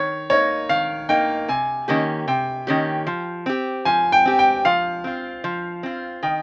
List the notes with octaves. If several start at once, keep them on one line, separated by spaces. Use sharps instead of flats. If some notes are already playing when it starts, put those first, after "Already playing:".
Already playing: D#3 C#5
A#3 D#4 C#5
D#3 F5
A#3 D#4 G5
C3 G#5
D#3 A#3 C#4 G4
C3 G5
D#3 A#3 C#4 G4
F3
C4 G4
F3 G#5
G5
C4 G4
G5
F3 F5
C4 F4
F3
C4 F4
D#3 G5